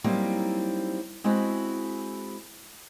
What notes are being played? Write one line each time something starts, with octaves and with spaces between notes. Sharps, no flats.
F#3 G3 A#3 C4 D#4 E4
G#3 C4 E4 F#4 G#4